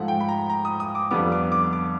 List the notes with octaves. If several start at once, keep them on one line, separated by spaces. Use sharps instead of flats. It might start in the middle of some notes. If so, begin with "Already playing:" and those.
Already playing: G#2 F3 A3 F#5
G5
B5
A#5
A#5
D#6
D#6
D6
F2 D3 G3 B3 D6
D6
D6
D6